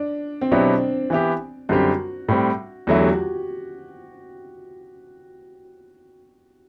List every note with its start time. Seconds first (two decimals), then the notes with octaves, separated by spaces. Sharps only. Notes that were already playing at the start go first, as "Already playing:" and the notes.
Already playing: D4
0.41 C4
0.52 B2 F#3 B3 D4 E4 G4
1.10 E3 B3 E4 G4
1.69 F#2 D3 G3 C4 F#4 G4
2.28 A2 G3 C4
2.87 E2 D3 F#3 A3 E4 F#4
2.99 G4
3.11 F#4